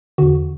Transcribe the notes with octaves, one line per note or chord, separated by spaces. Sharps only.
E2 D3 F#4